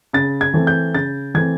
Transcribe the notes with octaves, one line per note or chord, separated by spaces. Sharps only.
C#3 A6
G#6
E3 A3 C4
G6
C#3 A6
E3 A3 C4 G#6